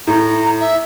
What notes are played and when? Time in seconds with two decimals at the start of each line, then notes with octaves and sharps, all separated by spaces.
0.07 A2 A#5
0.60 E5